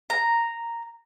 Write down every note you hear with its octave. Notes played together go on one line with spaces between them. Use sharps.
A#5